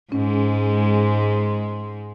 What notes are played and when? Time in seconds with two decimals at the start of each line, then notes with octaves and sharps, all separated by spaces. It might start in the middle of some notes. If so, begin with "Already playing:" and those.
0.12 G#2 G#3 C#4